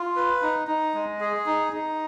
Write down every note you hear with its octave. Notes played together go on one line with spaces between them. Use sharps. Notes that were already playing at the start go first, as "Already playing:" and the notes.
Already playing: F4
B4
D#4
D#4
G#3
G#4
D#4
D#4